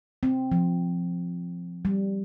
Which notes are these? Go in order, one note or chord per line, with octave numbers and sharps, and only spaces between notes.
C4
F3
G3